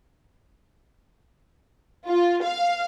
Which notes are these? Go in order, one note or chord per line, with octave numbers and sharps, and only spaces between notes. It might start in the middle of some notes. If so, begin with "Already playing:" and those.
F4
F5